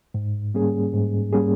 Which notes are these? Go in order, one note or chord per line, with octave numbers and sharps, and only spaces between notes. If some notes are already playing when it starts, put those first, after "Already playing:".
G#2
G3 A#3 C#4 G#4
G#2
G3 A#3 C#4 G#4